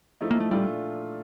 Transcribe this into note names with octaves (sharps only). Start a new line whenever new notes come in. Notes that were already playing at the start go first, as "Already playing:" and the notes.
A2 F3 A3 D#4
A#3
A3
A#2 G3 A3 D4 F4